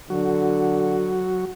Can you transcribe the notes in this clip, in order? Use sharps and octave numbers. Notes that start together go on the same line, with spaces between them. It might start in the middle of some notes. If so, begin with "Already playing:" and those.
D3 F#3 F#4